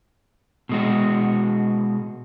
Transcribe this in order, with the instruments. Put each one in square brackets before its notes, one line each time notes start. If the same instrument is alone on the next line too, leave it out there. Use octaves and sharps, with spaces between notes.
[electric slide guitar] B2 G#3 F#4